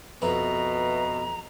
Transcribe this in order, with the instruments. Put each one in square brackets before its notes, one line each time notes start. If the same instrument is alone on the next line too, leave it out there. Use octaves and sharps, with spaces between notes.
[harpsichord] F2 [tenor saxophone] B2 [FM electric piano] B4 E5 [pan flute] A#5